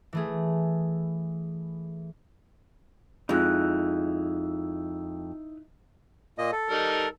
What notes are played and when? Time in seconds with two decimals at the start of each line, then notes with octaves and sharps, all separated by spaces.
0.13 E3 A3 G#4
3.29 F2 G#3 D#4 E4 F#6
6.38 A#2 A#3 D#5
6.52 A4
6.70 G3 D#4 A#4